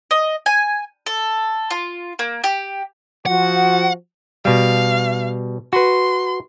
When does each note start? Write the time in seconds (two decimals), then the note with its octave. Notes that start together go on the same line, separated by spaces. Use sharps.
0.11 D#5
0.46 G#5
1.06 A4
1.70 F4
2.19 A#3
2.44 G4
3.26 F3 F#4 F#5
4.45 B2 G3 F5
5.73 F#4 B4 C6